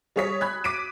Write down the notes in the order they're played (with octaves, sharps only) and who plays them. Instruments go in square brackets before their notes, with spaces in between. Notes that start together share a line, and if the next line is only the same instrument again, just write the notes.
[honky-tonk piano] G3 G#4 C#5 D#6 B6
B5 F#6 G#6
D6 B6 D7 D#7